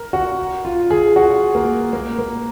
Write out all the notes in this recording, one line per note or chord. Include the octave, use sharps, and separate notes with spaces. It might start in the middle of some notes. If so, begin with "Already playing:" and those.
Already playing: A#4
F#4
F4
G#4
F#4
A#3
A#3
A#3